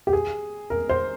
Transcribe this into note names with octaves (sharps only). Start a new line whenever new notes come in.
G4
G#4
A#4
C5